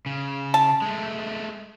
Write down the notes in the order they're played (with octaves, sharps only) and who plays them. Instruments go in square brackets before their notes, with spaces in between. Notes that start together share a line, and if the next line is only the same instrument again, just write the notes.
[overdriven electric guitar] C#3
[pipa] A5
[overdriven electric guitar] G#3 A3